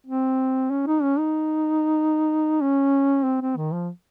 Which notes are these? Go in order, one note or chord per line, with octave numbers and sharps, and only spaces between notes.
C4
C#4
D#4
C#4
D#4
C#4
C4
C4
D#3
F3